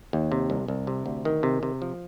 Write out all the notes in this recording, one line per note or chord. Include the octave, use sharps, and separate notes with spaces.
D#2
C3
C2
C2
C3
D2
D#3
C3
C3
F3